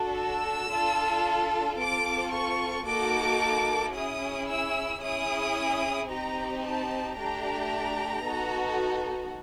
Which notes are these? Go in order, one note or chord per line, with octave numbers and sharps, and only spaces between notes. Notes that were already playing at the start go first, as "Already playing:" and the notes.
Already playing: D4 F#4 A4
E6
D4 F4 A4
C4 F4 A4 D6
C#6
A#3 D#4 F#4 A4 D6
C#4 E4 G#4 D#6
E6
C#4 E4 G#4 D#6
C4 D#4 G4 A#5
A5
A3 D4 G4 A#5
B3 D#4 F#4 A4